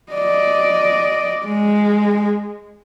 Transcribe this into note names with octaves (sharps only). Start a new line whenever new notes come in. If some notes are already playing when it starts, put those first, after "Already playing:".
D5 D#5
G#3